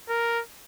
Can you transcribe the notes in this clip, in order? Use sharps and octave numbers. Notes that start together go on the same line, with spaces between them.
A#4